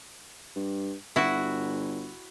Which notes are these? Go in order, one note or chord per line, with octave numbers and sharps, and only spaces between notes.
G2
G1 E4 F#4